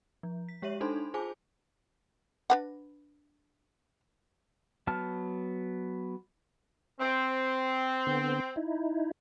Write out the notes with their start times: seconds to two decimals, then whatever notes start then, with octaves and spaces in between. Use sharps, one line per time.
0.23 F3
0.49 B6
0.62 G#3 G4 C#5 E5 D#7 F#7
0.81 D4 D#4 A4 C5 B5 C6
1.14 F4 G#4 C5 G#5 A5 D6
2.50 D4 B4 F#5
4.87 F#3 B3 A5 F6
7.00 C4
8.07 D3 B3
8.56 D#4 E4